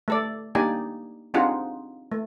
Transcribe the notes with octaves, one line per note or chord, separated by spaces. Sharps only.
A3 A4 D5
A#3 D4 D#4 G4 D5 G#5
C4 D4 D#4 F4 G#4 F#5
A3